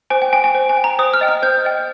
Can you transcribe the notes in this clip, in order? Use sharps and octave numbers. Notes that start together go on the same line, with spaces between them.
C5 G#5
G5
G5 G#5
G#5
C5
G#5
G5
A#5
C5 D#6
F6
D#5 G5
F6
C5 G6
D#5 G5